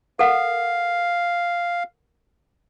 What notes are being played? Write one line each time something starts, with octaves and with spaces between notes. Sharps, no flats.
A4 A#4 F5 F#5